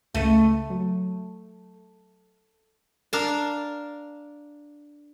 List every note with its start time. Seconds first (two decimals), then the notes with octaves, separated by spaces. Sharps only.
0.15 C#2 A3 D#7
0.70 F#3
3.13 D4 A#4 F5 A5